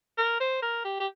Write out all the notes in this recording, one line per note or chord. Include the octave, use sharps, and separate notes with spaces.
A#4
C5
A#4
G4
G4